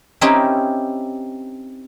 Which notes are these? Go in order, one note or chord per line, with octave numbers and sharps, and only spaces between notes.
C4 C#4 D#4 E4 G4 A#4